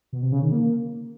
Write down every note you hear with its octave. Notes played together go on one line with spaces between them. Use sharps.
B2
C3
C#3
D#3
A#3